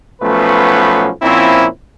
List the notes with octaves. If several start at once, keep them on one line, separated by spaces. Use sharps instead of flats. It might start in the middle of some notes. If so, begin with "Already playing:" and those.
B1 F3 A3 B3 C#4 B4
A#2 F3 C4 C#4 E4